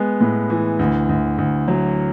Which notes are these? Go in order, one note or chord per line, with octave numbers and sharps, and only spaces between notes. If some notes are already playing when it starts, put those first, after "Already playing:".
Already playing: G#3 B3
A2
E3
D2
D2
D2
F#3